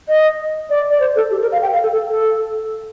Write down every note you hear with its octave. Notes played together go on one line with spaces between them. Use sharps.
D#5
D5
D5
C5
A4
G4
A#4
F5
G5
F5
A4
A4
A4